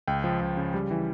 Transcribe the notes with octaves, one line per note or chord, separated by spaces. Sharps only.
C#2 G5
F3
C#2
C#3
G3
E3